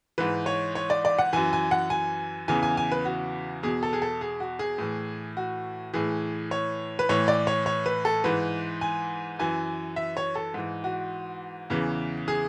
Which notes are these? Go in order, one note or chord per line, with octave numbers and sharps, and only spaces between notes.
G#2 E3 B4
C#5
C#5
D5
D5
F#5
F#2 E3 G#5
G#5
F#5
G#5
E2 C#3 E3 G#5
G#5
G#5
B4
F#4
E2 B2 G#4
A4
G#4
A4
G#4
F#4
G#4
A2 E3
F#4
A2 E3 G#4
C#5
B4
A2 E3 C#5
D5
C#5
C#5
B4
A4
G#2 E3 B4
G#5
F#2 E3 G#5
E5
C#5
A4
G#2 E3
F#4
E2 C#3 E3
G#4